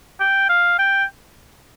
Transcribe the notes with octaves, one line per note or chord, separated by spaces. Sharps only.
G5
F5
G5